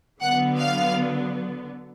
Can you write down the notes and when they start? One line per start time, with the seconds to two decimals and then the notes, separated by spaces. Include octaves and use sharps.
0.20 D3 F#3 B3 F#5
0.57 F5